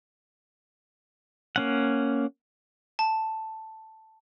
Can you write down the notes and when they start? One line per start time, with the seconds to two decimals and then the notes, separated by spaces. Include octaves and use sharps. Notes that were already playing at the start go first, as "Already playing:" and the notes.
1.56 A#3 C#4 F#5
2.99 A5